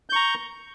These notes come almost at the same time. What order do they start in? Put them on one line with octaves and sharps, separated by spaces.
G6 C#6 A#5